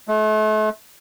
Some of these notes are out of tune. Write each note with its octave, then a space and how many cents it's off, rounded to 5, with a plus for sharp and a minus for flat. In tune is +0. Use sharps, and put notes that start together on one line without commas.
A3 -40